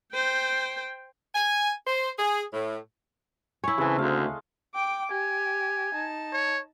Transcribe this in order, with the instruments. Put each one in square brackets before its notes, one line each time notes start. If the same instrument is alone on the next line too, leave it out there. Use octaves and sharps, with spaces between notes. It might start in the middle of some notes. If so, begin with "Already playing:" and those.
[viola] C5 G5
[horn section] G#5
C5
G#4
A2
[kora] E4 C#5 [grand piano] G#5
[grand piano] C#3 C4 [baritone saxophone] E3 [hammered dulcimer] G#3 A3
[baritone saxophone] D2 [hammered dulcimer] F5
[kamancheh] G5 D6
[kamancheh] G4 [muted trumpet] G#5
[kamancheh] D#4 A5
[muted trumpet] C#5